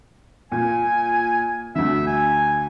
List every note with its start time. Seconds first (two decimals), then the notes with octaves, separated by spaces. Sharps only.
0.52 A#2 G#5
1.75 D2 D3 E5
2.07 G#5